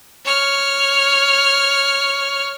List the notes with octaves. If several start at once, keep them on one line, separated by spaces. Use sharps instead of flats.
C#5 F6